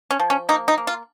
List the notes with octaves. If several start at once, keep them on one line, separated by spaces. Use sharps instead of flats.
C#4
F3
C#4
A#3 D#4
D#4
A#3
F4